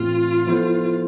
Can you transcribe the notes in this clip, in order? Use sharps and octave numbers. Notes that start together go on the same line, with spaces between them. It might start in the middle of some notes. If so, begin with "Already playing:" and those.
Already playing: A2 E3 A3 C4 F4
F3 B3 E4 A4 C5